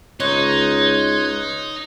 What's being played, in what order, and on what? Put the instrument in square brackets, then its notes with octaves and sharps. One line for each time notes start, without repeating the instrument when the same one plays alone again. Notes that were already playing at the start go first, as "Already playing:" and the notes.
[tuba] C#2 [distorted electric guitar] D#4 [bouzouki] C#5 [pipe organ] C6 F#6 G#6